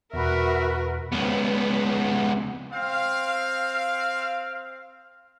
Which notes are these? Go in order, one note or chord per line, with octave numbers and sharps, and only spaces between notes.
E2 B2 F#4 A#4 B4 E5
C#2 B3
C4 F5